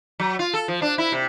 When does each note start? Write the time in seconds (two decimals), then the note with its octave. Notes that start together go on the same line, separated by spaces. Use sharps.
0.20 F#3
0.39 F4
0.54 A4
0.68 F3
0.82 D4
0.98 E4
1.12 C3